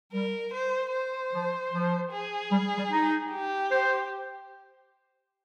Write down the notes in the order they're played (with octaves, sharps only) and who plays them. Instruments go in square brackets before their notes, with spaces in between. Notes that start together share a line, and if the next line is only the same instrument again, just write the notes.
[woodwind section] G3 [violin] A#4
[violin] C5
C5
[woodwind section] F3
F3
[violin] G#4
[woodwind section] G3
G3
D#4
[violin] G4
[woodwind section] C5